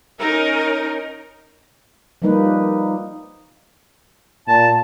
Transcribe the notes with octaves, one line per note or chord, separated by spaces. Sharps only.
C#4 D#4 A#4
F3 G3 A#3 D#4 B4
A#2 A5